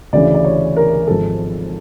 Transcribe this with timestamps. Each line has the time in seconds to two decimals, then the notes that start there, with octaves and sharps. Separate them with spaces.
0.13 D2 C#3 E3 D5
0.34 D5
0.45 C#5
0.77 A#4
1.08 G#1 G#2 F3 A4